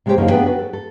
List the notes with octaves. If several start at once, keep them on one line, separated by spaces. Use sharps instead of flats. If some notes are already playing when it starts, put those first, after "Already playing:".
C3 G#3 A3 B3 G4 C5
F#2 C#3 E3 F3 A#3 D#4
B3 D4 G#4 B4 G5
F#4 B4
A4
A4